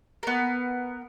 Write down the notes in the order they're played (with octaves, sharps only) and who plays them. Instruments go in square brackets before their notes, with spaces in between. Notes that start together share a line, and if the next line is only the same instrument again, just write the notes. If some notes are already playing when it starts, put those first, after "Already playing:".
[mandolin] B3 A#4